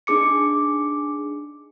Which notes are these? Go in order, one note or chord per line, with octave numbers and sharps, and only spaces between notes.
D4 D#4 G#4 D6 C#7